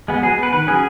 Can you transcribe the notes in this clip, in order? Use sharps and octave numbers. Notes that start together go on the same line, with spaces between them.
G#3 B3
F#3 G#4
B3 B4
D#3 B4
F#3 C#4 G#4